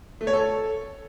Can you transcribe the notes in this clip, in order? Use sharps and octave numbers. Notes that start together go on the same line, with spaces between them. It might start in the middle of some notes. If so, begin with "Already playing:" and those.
A3
C#5
A4